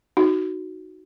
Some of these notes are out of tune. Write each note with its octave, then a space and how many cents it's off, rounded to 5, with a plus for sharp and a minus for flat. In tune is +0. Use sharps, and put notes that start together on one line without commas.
D#4 +0 F#4 +0